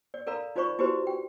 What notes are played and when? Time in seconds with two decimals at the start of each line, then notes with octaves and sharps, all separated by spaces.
0.14 D5
0.27 A4 A#4 D5 F5 A#5 B5
0.56 D#4 F4 C5 D5 B5 C#6
0.79 E4 F#4 G4 B4 C5 B5
1.07 G5